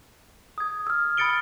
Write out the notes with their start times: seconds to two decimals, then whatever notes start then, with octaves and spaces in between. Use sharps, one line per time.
0.58 D#6 G#6
0.87 E6 F6
1.17 B5 D#6 A6 C#7 D7 G7